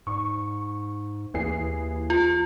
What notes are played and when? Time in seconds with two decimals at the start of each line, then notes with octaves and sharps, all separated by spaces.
0.07 G#2 C#6
1.34 D#2 E3 G#4 C7
2.10 F4